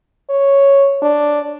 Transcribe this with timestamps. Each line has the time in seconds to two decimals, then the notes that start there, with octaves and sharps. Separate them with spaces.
0.30 C#5
1.02 D4